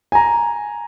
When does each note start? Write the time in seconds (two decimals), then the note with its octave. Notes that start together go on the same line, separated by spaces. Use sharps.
0.12 G#5 A#5